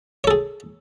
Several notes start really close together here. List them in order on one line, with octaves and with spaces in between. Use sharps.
C#5 A4 G#4